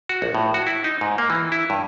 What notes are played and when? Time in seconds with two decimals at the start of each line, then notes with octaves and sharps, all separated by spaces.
0.09 F#4
0.22 A#1
0.35 A2
0.54 F#4
0.67 E4
0.84 D#4
1.01 G#2
1.18 A#3
1.30 E3
1.52 E4
1.70 G2